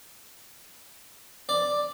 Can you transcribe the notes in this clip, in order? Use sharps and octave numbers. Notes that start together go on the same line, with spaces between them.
D5